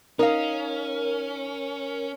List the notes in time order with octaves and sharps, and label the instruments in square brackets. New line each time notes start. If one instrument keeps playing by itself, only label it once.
[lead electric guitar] C#4 [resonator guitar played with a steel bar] D#4 D#5 F5 [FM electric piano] A#4